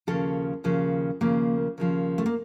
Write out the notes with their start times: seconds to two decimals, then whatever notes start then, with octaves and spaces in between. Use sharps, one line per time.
0.07 D#2 C#3 F3 A4
0.64 D#2 C#3 F3
1.21 D#2 C#3 F3 A#3
1.78 D#2 C#3 F3
2.18 A3
2.26 A#3